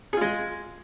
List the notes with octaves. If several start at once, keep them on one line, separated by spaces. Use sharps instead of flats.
G#3 F4 G#4